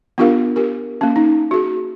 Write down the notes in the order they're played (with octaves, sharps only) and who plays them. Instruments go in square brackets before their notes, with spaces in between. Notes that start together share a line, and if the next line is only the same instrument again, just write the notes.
[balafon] B3 D4 F4 G4 A#4 F5
G4 A#4
A#3 C#4
D#4
F#4 G#4